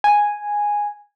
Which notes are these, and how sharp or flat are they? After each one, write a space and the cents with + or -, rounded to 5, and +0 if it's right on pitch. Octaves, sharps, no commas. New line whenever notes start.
G#5 -5